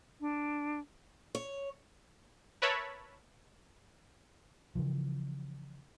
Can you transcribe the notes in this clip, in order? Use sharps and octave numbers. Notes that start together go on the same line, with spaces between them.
D4
C#5
A#4 B4 C#5 E5 A5 B5
C#3 E3 F3